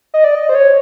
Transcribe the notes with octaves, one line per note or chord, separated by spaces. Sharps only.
D#5
D5
D#5
C5
C#5